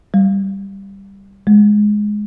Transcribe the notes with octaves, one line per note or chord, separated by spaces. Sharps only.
G3
G#3